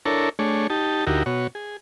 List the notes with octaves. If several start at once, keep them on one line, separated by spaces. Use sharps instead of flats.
D4 E4 A4 A#4 C#5
A3 D4 G#4 C#5
D#4 G4 A5
D2 D#4 E4 F#4 G4 A#4
B2 F#4 C#5
G#4